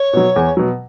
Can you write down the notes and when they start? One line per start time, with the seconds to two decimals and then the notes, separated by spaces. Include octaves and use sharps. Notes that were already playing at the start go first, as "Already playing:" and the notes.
Already playing: C#5
0.13 B2 F#3
0.36 E2
0.57 B2 F#3